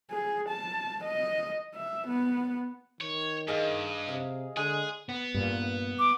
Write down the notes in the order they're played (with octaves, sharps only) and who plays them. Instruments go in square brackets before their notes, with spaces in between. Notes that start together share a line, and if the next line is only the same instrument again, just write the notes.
[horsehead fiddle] G#4
A5
D#5
E5
B3
[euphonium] D#3 [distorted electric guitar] C#5
[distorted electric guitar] G2 [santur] G#4 D#5 F5
[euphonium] C3 [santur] F5
[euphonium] D3 [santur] G#3 [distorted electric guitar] G#4
[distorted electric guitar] B3
[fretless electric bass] G2 A#2
[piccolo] D6